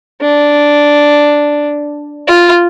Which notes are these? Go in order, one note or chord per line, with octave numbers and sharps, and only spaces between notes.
D4
F4